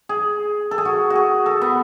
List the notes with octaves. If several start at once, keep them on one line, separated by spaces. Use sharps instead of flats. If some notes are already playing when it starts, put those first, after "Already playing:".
G#4
A4
G#4
F#4
F#4
G#4
A4
B3